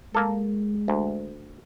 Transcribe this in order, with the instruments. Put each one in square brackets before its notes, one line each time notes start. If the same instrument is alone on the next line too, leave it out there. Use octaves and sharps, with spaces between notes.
[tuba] G#3 [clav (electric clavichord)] A#3 A4
[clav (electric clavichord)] D2